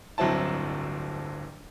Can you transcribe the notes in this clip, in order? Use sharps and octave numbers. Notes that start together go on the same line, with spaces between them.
D1 G1 F#3 C4 E4 A5